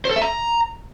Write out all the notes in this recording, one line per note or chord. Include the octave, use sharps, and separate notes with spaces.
C5
A4
E5
A#5